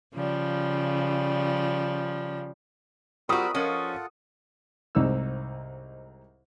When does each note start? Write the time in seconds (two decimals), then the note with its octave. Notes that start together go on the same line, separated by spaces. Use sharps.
0.14 C#3 F3 G3
3.29 G3 C4 F4 F#4 A#4 B5 C#6 D#6
3.54 F3 C#4 F4 A4 A#4 D#5 F#5
4.95 C2 G#2 C4 D#4 E6